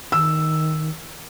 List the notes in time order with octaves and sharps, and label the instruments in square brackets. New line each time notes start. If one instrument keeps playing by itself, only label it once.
[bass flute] D#3 [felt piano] E6